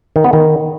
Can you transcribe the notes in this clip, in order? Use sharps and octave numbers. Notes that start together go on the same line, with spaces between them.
D#3
B3
D#3